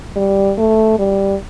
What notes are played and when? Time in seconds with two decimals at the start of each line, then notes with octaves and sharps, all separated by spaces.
0.16 G3
0.58 A3
0.99 G3